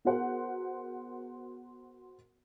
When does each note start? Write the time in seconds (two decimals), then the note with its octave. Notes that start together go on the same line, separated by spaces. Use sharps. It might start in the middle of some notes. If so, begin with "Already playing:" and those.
0.05 B3 F#4 G#4 A#4 C5 F#5